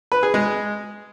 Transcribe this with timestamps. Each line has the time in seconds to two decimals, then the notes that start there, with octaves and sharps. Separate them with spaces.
0.12 B4
0.23 G#4
0.34 G#3